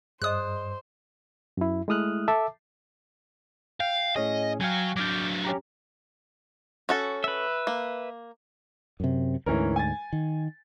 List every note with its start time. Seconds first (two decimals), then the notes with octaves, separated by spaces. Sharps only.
0.22 G2 G#4 C5 D5 D#5 D#6 F#6
1.57 F#2 E4
1.88 G#3 A3 E4 D#6 F6 F#6
2.28 A4 E5 A5 D6
3.80 F5 G5
4.16 A2 C#4 G#4 D#5
4.60 F#3 F5 G5 G#5
4.96 F#3 D4 D6 F6 G6
5.45 C#4 G4 A#5
6.89 C#4 F#4 A4
7.24 B4 E5
7.67 A#3
9.00 F#2 C3
9.46 D2 G#2 E3 C#4 A#4
9.76 G#5 A6
10.13 D#3